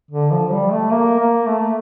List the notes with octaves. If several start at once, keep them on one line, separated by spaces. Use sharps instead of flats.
D3
F3
G3
A3
A#3
A#3
A3